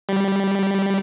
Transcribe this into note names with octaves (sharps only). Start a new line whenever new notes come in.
G3